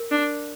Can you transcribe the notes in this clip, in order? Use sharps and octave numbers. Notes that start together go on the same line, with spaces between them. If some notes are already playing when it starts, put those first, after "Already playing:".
Already playing: A#4
D4